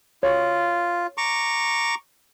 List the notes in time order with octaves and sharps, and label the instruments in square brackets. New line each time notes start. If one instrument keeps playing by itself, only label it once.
[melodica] F4 [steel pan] C#5
[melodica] A#5 C#6 D6